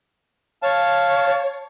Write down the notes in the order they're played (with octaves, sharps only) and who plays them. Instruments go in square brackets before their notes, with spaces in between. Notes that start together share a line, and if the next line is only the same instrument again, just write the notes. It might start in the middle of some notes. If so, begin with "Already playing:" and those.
[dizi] C#5 [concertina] F5 A5